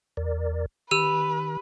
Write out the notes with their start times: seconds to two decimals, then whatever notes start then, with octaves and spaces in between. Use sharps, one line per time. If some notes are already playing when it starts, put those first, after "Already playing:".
0.17 E2 A#4 D5
0.91 D#3 G4 B4 E6 D#7